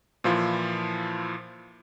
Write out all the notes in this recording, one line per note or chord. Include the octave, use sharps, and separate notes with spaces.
A#2 E3 F3 E4 F4